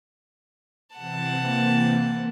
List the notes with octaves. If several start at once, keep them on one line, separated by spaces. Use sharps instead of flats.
C3 E3 C4 F#5 A5
A#3